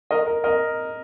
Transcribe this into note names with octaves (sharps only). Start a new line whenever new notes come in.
A#4 D#5
A#4
A#4 D#5